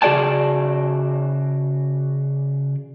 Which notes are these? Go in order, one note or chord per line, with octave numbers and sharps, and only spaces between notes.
C#3 F#4 G#4 D5 G#5 A5